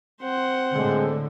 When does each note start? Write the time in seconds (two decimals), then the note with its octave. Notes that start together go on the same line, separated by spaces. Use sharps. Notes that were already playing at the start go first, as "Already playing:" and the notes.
0.22 C4 C5 F#5
0.75 A2 D3 G#3